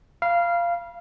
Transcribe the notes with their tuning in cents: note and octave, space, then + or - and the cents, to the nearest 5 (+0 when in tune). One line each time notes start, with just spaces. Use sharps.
F5 -15 B5 -35